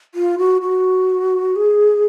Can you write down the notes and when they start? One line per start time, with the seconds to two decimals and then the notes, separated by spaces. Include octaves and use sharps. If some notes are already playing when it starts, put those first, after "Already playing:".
0.15 F4
0.38 F#4
0.62 F#4
1.56 G#4